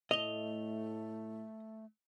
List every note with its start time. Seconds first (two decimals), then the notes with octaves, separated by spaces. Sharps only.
0.11 A2 A3 D#5 F7 G7